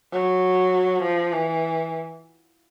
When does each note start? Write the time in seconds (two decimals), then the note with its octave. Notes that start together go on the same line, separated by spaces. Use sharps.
0.13 F#3
1.03 F3
1.33 E3